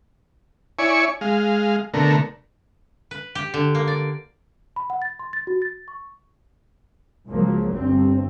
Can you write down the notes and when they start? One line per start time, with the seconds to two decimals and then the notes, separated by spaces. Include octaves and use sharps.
0.79 E4 C#5 D5 G#5 C#6
1.21 G#3 F5
1.94 B2 D3 A3 A#4
3.11 B4
3.35 G4
3.54 D3
3.75 A#3
3.88 D5
4.76 B5
4.90 F#5
5.02 A6
5.19 C6
5.33 A6
5.47 F#4
5.62 A6
5.88 C#6
7.28 C#2 F3 F#3 A#3
7.75 G1 G2 C4